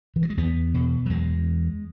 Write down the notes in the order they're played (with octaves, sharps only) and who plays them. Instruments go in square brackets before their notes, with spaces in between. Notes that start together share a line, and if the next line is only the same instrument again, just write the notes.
[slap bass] E3
F#3
G#3
E2 B3
B2
F#3
E2 G#3